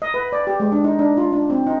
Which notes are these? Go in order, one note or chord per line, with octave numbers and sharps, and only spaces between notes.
D#5
B4
D5
G4
G#3
D4
D#4
D4
F4
D4
C4
D#4